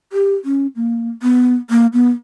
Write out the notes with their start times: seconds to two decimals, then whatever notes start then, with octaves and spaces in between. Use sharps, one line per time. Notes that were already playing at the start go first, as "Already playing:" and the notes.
0.13 G4
0.45 C#4
0.76 A#3
1.23 B3
1.70 A#3
1.93 B3